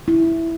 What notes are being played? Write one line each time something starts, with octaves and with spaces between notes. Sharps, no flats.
E4